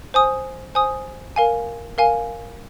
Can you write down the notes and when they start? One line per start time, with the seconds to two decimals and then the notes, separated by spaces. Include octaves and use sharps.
0.14 C5 G#5 D#6
0.75 C5 G#5 D#6
1.36 A#4 F5 G#5
1.98 A#4 F5 G#5